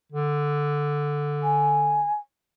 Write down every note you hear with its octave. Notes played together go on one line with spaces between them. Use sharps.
D3
G#5